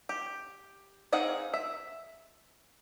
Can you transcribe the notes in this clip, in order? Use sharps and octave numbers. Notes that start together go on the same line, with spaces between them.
G4
C4 D#4 G#4 F5 F#5
E5